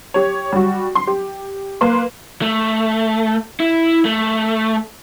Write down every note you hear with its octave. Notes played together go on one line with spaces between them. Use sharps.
G4 C#5
G3 F#4
C6
G4
A#3 B4 C6
A3
E4
A3